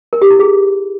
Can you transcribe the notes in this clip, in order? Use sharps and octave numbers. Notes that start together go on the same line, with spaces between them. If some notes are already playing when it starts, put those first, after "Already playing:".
A#4
G4
E4
G#4